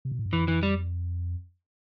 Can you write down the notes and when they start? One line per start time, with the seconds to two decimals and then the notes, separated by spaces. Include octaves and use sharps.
0.05 C3
0.11 B2
0.19 A2
0.26 G2
0.33 F2 E3
0.48 E3
0.63 G3